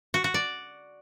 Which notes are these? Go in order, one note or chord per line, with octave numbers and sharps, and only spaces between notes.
F#4
F#4
D5